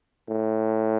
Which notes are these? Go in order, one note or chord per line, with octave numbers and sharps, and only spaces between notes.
A2